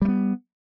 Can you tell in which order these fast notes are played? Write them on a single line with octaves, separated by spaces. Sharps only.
G3 A3 B3